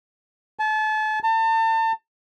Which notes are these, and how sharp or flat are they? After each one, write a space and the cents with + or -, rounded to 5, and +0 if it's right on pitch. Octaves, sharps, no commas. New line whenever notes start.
A5 -35
A5 +35